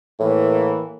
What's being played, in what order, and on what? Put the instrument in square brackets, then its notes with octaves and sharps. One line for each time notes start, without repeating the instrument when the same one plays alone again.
[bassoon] A2 [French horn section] E3 A#3